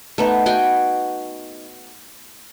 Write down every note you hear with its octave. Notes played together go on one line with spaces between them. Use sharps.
A3 B3 D#4
F#4 D#5 G5 G#5